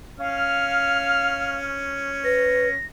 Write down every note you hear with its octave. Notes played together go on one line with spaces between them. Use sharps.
C#4 F5 F6
B4 A#6